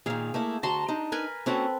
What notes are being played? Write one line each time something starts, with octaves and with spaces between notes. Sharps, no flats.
A#2 D#3 G#4 F5
A3 A#3 E4
D2 F#4 A5 A#5 C6
D4 D#4
A#4 B4 G#5
A#3 C4 C#4 F#4 A4 B4